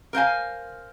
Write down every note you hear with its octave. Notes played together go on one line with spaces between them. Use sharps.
A#4 C5 F5 G#5